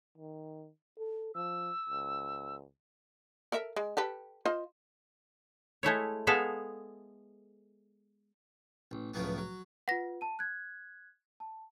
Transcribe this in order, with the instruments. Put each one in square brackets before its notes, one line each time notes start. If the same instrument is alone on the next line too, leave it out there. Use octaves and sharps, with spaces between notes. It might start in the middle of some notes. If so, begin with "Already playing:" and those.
[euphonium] D#3
A4
[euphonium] F3 [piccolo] E6
[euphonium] C#2
[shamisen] A4 A#4 E5
G#3
G4 A4 B4
F4 C5 D#5
[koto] G#3 A3 E4 C#5
G#3 B3 G#4 A4 E5 F5
[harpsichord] A1
C#2 A2 F3 F#3 B3
F#3
[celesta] F4 B4 [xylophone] F#5 A#6
[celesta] A5 D#7
F#6 G#6
A5